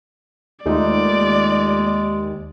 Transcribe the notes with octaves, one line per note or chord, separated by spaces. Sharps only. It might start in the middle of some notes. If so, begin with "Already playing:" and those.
D#2 G#3 A3 D#4 F4 D5